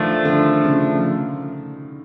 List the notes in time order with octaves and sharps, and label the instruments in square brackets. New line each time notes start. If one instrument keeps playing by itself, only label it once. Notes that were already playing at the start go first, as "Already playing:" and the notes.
Already playing: [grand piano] D#3 [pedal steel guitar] F3 A3 D4
[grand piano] D3
C#3